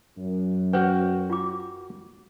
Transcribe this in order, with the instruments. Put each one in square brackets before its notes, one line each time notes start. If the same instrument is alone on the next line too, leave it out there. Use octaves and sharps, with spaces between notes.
[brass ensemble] F#2
[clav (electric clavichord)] F#4 F#5 G5 [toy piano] B4 C#5
[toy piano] F4 D6